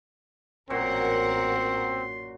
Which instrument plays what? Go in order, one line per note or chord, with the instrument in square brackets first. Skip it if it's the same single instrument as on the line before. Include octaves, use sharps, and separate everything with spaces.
[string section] A1 A#4 F#5 [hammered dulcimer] F#2 A#2 F#4 [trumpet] C4 [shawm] C6